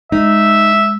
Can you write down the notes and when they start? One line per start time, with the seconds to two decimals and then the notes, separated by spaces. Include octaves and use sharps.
0.12 G#3 D#4 E5